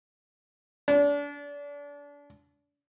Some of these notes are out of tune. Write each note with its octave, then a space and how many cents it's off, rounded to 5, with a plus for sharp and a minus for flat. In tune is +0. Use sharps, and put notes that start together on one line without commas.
D4 -30